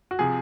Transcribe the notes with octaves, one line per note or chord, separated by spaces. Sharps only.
F#4
C3 F3 G#4